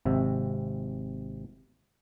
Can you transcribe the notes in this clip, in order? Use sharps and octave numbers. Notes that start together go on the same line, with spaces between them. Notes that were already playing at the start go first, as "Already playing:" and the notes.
G#1 C3 E5